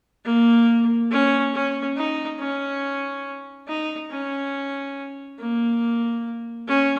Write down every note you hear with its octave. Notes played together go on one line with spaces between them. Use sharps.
A#3
C#4
C#4
D#4
C#4
D#4
C#4
A#3
C#4